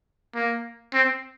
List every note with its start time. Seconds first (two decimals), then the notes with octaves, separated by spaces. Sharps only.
0.35 A#3
0.93 C4